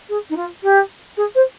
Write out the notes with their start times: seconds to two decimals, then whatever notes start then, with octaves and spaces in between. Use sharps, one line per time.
0.08 G#4
0.29 D#4
0.36 F4
0.62 G4
1.16 G#4
1.35 C5